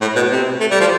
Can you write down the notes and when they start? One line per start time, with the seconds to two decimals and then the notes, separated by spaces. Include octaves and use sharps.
0.01 A2
0.16 B2
0.31 C3
0.60 A3
0.71 G3
0.80 F3